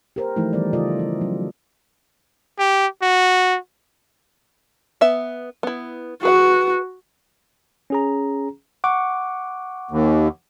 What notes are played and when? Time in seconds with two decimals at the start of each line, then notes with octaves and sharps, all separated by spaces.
0.16 G4 A#4 C5
0.36 E3 F3 A3 D#4 E4
0.53 D#3 E3 G3 B3 D5
0.73 C#3 F4 A4 D5 D#5
0.99 E4
1.21 F#3 C#4
2.59 G4
3.02 F#4
5.01 B3 E5
5.63 B3 E4
6.23 F#4 G#4 B4 F#5
7.90 C#4 G#4 A#5
8.84 F#5 C#6 D6
9.91 D#2